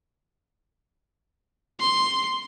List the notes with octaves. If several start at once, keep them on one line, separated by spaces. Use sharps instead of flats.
C6 C7